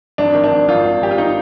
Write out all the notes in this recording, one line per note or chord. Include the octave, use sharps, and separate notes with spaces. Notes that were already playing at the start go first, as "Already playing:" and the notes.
G#1 D4
D#3
D4
G#1
G#1 F4
G#1
G#1 G4
F4
D#3 D#4